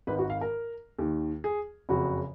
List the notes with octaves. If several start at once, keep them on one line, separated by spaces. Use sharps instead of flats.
G#1 G#2 D#3 B4
F#4
F5
A#4
D#2 D#3
G#4
F#1 F2 C#3 F#4